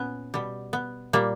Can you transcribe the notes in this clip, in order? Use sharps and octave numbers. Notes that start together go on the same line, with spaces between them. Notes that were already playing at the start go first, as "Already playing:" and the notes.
Already playing: A#2 B3 C#4
B2 G3
B3
A#2 G3 A#3